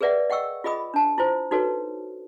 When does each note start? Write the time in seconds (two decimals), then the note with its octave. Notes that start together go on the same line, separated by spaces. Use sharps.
0.01 G#4 A#4 B4 D5 E5 F#5
0.30 D#5 F#5 G5 C#6 E6
0.64 F4 G#4 D#5 B5 D#6
0.94 D4 A5
1.18 E4 F4 C5
1.51 D#4 F#4 A4 B4 C#5